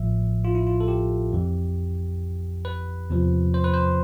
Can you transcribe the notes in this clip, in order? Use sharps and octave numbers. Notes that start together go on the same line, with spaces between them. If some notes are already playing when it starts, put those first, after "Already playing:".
Already playing: A1 A2 F3 E5
F4
E4
F4
A4
G4
F2 E3
B4
E2 C3 F3
C5
B4
C5